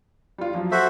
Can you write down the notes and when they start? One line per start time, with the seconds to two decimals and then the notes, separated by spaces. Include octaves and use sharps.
0.38 G3 F4
0.54 F3 F#3
0.72 F#4 A4 C5 E5